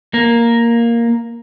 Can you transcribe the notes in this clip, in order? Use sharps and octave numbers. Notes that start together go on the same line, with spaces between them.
A#3